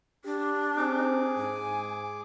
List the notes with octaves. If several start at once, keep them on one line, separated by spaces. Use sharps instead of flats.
D4 G4
C4 G#4 D6
G#2 G#5